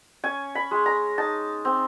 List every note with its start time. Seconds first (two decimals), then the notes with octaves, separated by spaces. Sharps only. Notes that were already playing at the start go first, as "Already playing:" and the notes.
0.24 C#4 G#5
0.55 B5
0.71 G#3
0.86 A#5
1.18 D#4 A5
1.65 C4